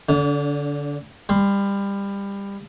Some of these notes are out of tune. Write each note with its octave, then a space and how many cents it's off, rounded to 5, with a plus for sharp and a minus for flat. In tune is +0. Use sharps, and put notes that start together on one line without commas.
D3 -15 D4 -45
G3 +25 C6 +0